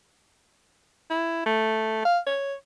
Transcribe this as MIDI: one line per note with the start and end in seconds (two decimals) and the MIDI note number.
1.10 1.45 64
1.46 2.03 57
2.05 2.19 77
2.27 2.54 73